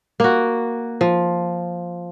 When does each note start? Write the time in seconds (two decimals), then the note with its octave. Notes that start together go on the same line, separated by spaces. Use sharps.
0.20 A#3 F#4
1.01 F3